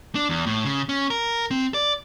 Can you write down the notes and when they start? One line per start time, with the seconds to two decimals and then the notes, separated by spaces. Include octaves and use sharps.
0.15 D4
0.29 E2
0.46 A2
0.65 C#3
0.89 C#4
1.10 A#4
1.51 C4
1.74 D5